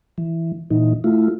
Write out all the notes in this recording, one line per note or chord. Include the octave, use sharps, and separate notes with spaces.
E3
A#2 E3 D#4
A3 E4 F4